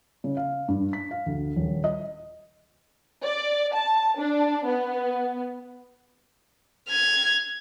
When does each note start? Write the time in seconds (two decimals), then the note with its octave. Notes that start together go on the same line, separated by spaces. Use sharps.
0.24 C#3
0.37 F5
0.68 G2
0.93 B6
1.11 F5
1.26 D2
1.56 D#1
1.84 D#5
3.24 D5
3.74 A5
4.19 D4
4.66 B3
6.89 F6 G#6